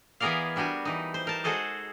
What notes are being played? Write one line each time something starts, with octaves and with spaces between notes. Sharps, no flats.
E3 B3 G#4 A#4 D5 F5
G3 D4 F#4 G4 G#5
E3 D#4
C5
A#4 A5
G#3 F#4 G#4 A4 C5 D#5